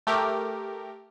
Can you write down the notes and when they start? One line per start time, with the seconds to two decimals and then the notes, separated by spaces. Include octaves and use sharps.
0.07 A3 G4 A#4